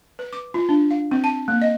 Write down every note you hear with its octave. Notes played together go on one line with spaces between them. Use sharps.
B4
D6
F4
D4
F5
C4
A5
A#3
D#5